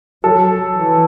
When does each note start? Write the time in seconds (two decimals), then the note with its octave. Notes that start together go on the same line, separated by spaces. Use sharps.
0.24 F#3 A4
0.76 E3